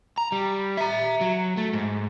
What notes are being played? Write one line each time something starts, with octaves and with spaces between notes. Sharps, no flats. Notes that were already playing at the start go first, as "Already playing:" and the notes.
A#5
G3
E5 A#5
F#3
A3
G#2